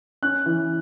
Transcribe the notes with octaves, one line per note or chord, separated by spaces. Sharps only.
C#4 F#6
E3